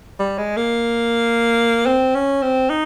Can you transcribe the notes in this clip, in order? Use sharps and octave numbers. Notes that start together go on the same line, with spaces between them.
G3
G#3
A#3
C4
C#4
C4
D#4